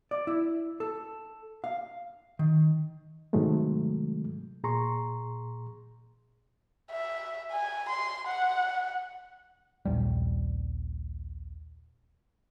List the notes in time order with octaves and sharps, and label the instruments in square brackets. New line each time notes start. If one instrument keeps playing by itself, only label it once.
[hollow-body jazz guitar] D5
E4
A4
F5
D#3
[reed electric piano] G#2 C3 D#3 F#3 G#3 A3
A#2 G#4 A#5 C6 C#6
[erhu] E5
G#5
C6
F#5
[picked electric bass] A#1 D#2 G3